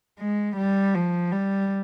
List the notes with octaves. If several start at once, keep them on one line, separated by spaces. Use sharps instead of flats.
G#3
G3
F3
G3